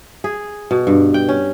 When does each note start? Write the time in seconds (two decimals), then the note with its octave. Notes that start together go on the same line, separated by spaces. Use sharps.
0.24 G#4
0.71 B2
0.87 G2
1.14 G5
1.29 C#4